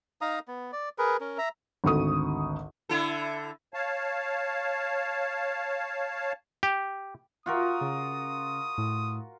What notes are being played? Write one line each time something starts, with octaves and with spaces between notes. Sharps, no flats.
D#4 F5 A#5 D#6
B3
D5
G#4 A#4 B4
C#4 A#4
E5 A#5
G#1 D2 A4 C#6 D#6
D3 E4 A4
C#5 F5 A5
G4
F4 F#4 A#4 D#6
C#3
A2